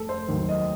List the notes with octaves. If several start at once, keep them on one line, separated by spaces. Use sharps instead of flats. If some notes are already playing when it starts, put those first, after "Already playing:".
Already playing: F1 A4
C5
D#2 D#3 F#3
D#5